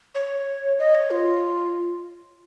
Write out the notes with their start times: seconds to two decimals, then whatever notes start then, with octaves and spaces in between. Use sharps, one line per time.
0.15 C#5
0.79 D#5
0.95 C#5
1.11 F4